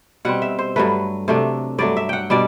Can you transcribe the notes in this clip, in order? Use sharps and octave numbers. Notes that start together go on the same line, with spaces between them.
B2 G3 C4 F#5
E5
C5
G2 F#3 A3 B4
C3 F#3 A3 D4
G2 F#3 A3 D5
E5
F#5 G5
B2 G3 D4 D5